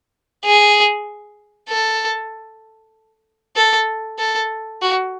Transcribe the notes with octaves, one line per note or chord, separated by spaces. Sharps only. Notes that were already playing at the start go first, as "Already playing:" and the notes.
G#4
A4
A4
A4
F#4